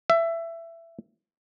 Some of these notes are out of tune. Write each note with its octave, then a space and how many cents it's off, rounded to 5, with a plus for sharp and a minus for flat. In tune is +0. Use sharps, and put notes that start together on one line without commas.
E5 +15